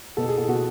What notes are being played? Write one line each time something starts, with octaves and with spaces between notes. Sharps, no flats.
B2 A4
G#4
A4
B2 F#4